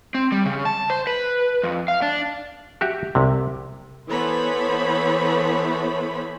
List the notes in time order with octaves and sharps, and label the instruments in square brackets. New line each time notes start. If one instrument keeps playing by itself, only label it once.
[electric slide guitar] C4
G3
C#3
A5
C5
B4
F2
F5
D4
[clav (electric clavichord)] F#4 G4 E5
C2 C3
[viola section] E3 B3 A4 C5 C#5 B5